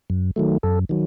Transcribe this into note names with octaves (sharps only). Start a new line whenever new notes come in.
F#2
D#3 F#3 A3
F#2 A4
D#3 F#3